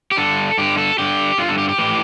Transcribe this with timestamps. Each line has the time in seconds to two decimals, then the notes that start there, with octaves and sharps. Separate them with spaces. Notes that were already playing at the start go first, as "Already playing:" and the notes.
0.11 G4
0.17 G2 D3 A4
0.58 G2 D3 G4
0.78 A4
0.98 G2 D3 G4
1.38 G2 D3 F4
1.49 A4
1.58 G4
1.69 G4
1.78 A2 E3